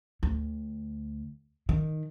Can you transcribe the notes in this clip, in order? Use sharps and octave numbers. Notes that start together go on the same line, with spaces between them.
D2
D#3